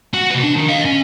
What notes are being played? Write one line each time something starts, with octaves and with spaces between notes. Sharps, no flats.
F#4 F#5
C3 B4
D4
D#3
D#5 F5
C#4